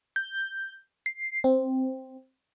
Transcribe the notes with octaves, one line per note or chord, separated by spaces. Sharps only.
G6
C7
C4